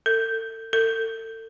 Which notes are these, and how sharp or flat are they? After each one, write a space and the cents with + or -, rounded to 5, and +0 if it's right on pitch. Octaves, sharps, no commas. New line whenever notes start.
A4 +40
A4 +40